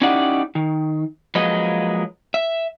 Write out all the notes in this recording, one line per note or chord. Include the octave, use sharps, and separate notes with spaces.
C#4 D#4 E4 G4 D5 F#5
D#3
F3 F#3 G#3 A#3 B4 D#5
E5